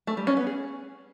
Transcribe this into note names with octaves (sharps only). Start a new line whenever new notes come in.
A3
G3
C#4
B3
G#4